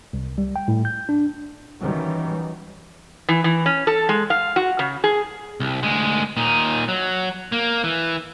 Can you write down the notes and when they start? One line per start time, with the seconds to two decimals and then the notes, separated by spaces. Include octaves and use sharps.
0.13 C2
0.38 G3
0.56 G5
0.68 A2
0.85 G6
1.09 D4
1.81 D#3 E3 F#3 G3 C#4
3.29 E3
3.44 E3
3.66 C#4
3.87 A4
4.09 G#3
4.30 F5
4.56 F#4
4.79 C#3
5.04 G#4
5.60 C2
5.83 D2 G#3
6.37 A#2 D#4
6.88 F#3
7.52 A#3
7.84 E3